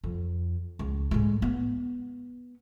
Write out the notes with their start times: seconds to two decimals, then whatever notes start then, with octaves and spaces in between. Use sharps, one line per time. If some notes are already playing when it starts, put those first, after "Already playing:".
0.04 F2
0.79 C#2
1.11 A2 G#3
1.42 B3